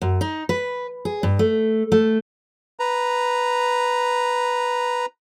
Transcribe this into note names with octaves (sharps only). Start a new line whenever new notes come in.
F#2
D#4
B4
G#4
G2
A3
A3
B4 A#5